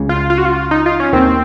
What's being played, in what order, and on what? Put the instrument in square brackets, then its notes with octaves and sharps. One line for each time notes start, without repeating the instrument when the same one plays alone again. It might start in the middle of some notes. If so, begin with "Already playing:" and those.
Already playing: [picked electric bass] C#2 C#3
[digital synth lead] F4
F4
F#4
F4
D#4
F4
C#4
[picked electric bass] D#2 D#3 [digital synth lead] C4